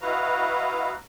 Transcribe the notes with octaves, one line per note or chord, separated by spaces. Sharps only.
E4 F#4 B4 D#5 F5 A#5